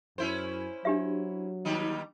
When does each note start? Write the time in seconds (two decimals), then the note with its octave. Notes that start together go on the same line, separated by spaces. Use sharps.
0.18 F#2 C#4 E4 C5
0.85 F#3 D4 G4 E5
1.65 D#2 G3 D#4